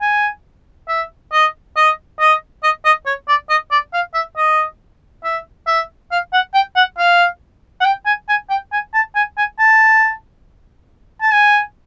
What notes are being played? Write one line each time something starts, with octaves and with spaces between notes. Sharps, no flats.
G#5
E5
D#5
D#5
D#5
D#5
D#5
C#5
D5
D#5
D5
F5
E5
D#5
E5
E5
F5
F#5
G5
F#5
F5
F#5
G5
G#5
G#5
G5
G#5
A5
G#5
G#5
A5
A5
G#5